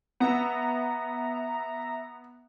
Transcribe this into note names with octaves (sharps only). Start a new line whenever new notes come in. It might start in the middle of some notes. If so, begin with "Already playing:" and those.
B3 E5 A#5